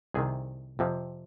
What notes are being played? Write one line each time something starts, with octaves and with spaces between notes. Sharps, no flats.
C2 C3 D#3 G#4
F2 C3 F3